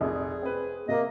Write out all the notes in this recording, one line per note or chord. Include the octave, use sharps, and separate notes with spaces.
F1 A#1 D#4 G#4
C4 B4
C3 A#3 D#5